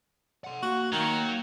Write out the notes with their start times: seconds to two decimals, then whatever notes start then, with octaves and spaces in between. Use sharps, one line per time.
0.44 F#5 C6
0.62 A#3 F#4
0.92 D#3 F#3 A#3